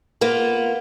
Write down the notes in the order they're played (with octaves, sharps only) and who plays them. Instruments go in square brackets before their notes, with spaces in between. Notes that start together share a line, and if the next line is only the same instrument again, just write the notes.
[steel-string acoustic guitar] A#3 B3 F4